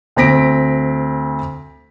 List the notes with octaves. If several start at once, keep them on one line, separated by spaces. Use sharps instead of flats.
D2 C4 A#6 B6 D7